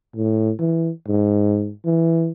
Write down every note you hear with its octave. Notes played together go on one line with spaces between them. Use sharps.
A2
E3
G#2
E3